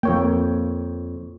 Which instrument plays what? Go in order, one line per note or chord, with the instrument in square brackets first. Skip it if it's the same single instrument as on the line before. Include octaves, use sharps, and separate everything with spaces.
[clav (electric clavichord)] F2 C#5 G5 [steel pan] A#3